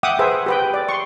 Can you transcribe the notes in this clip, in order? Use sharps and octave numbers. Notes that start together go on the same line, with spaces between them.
E5 F#5 G5 D6 D#6
G#4 B4 C5 E5
G4 B4 G5
D5
C6 C#6